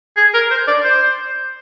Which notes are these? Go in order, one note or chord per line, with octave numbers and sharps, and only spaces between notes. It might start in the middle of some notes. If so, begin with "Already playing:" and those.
G#4
A#4
C5
D5
C5